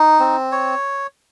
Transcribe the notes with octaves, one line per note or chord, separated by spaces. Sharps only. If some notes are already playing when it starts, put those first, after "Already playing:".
Already playing: D#4
C4
C#5